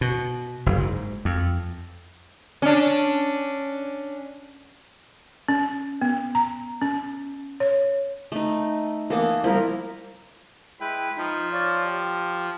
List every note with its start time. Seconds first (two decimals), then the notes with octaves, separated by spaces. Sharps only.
0.01 B2
0.66 F#1
0.78 G#2
1.25 F2
2.62 C#4 D4
5.48 C#4
6.01 B3
6.35 A#5
6.82 C#4
7.60 C#5
8.32 A3 D#4
9.10 E3 A#3 B3 A4
9.44 C2 F3 E4 A#4
10.80 G#3 E4 B4 G5
11.17 F3 D#4
11.53 C#5 D5 F5
11.84 G4